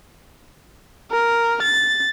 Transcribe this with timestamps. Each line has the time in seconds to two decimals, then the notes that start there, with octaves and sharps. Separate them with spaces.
1.11 A#4
1.62 A6